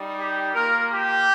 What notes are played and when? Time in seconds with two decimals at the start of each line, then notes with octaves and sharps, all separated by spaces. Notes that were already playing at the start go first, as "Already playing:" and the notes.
Already playing: G3 D#4
0.19 G4
0.54 A#3 F4 A#4
0.90 G4